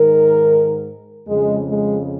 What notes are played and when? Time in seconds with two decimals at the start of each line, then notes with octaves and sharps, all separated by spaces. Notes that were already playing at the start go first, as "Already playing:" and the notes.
Already playing: G#2 D#3 A#4
1.28 F2 C#3 G#3
1.68 G#3